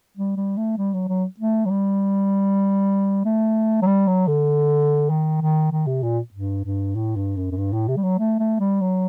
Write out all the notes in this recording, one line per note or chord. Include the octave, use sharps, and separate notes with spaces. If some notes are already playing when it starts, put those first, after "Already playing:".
G3
G3
A3
G3
F#3
F#3
A3
F#3
G3
A3
F#3
G3
F#3
D3
D#3
D#3
D#3
C3
A#2
G2
G2
A2
G2
F#2
F#2
G2
A2
C3
G3
F#3
A3
A3
G3
F#3